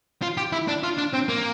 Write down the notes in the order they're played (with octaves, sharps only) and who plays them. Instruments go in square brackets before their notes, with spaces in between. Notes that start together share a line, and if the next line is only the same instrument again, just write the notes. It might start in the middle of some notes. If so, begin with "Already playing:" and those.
[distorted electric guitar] F4
G4
E4
D4
F4
D4
C4
A#3